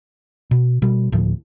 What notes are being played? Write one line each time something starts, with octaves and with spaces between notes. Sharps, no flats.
B2
B2 G3
D2 A2 F3